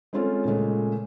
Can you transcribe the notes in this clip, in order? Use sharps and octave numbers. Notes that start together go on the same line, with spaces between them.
G#3 C4 C#4 F4 A4 C#5
A#2 C#3 G#3 A3